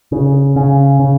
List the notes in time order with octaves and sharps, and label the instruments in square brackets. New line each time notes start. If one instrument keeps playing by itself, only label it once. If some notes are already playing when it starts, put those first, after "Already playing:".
[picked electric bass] C#3
C#3
C#3